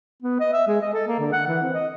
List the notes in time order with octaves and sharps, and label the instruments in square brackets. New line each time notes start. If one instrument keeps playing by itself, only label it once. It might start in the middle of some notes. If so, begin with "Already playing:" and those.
[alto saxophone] B3
D#5
E5
G#3
D#5
A4
A#3
D3
F#5
E3
C4
D#5